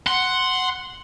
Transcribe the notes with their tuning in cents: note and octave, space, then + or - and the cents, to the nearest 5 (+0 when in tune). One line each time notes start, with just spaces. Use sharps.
F#5 +0 C6 +0